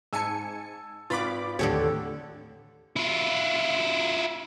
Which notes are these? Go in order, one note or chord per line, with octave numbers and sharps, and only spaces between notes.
G#2 G#5 A5 E6 C#7
G#1 F4 B4 B5 D6 A6
D#2 A2 D3 G4 A4 C#5
E4 F4